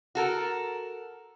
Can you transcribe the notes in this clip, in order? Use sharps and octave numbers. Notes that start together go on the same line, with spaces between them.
F#4 A4 A#4